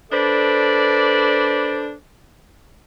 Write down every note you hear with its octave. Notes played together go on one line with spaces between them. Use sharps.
D4 A4 B4 C5 D5